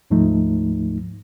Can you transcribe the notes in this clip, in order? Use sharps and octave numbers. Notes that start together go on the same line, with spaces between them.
D2 G#2 F3 A3 D#4